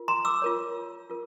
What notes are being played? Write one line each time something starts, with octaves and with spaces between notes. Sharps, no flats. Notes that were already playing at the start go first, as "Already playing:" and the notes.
Already playing: F4 A#4
A#5 C6
D6 E6
F4 A#4 C#5
F4 A#4